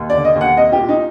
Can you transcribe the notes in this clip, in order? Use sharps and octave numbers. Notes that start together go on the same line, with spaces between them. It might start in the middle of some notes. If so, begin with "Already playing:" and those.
Already playing: D#2
D3 D5
D#5
D#2
F#5
C2 D#5
G4
A#2
D#4